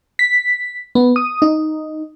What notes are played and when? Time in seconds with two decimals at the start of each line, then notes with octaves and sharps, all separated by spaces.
0.19 B6
0.95 B3
1.16 D#6
1.42 D#4